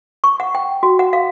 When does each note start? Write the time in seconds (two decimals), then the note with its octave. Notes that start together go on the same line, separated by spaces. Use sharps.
0.24 C#6
0.40 F#5
0.55 G5
0.83 F#4
0.99 F#5
1.13 F5